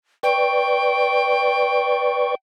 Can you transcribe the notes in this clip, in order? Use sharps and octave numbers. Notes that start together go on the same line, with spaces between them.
B4 D5 G5 C#6